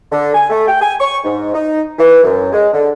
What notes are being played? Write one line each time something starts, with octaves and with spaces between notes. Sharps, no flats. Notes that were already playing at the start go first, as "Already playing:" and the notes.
D3
G#5
A3
G5
G#5
C#6
G#2
D#4
E3
F#2
G#3
D3